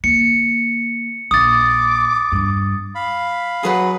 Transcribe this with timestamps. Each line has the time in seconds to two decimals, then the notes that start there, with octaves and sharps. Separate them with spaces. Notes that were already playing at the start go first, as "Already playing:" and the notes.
0.04 A#3 C#7
1.31 A#1 D6 D#6 A6
2.32 G2
2.95 F5 B5
3.63 F#3 G#4 B4 F#5